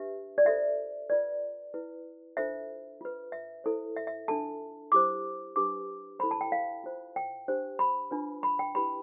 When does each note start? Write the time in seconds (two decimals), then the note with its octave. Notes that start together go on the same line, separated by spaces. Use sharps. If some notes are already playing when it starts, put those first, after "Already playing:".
Already playing: D4 G4 B4 E5
0.38 D5
0.45 F4 A4 C5 E5
1.09 F4 B4 D5
1.74 E4 B4
2.37 D4 F4 A4 C5 E5
3.01 F4 B4
3.32 E5
3.64 E4 A4 C5
3.96 E5
4.07 E5
4.28 D4 F4 A4 A5
4.92 E4 G4 C5 D6
5.56 D4 G4 B4 D6
6.19 C5 B5
6.23 E4 A4
6.31 A5
6.41 G5
6.52 F5
6.84 F4 C5
7.16 G5
7.48 D4 G4 C5
7.79 B5
8.11 D4 F4 B4
8.43 B5
8.59 G5
8.75 E4 G4 B4 B5